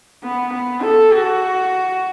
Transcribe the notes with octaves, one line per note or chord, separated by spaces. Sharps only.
B3
B3
A4
F#4